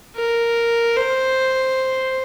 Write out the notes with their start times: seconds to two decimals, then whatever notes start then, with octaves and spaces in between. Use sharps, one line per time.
0.16 A#4
0.97 C5